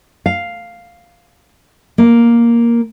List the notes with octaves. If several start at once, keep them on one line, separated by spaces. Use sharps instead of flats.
F5
A#3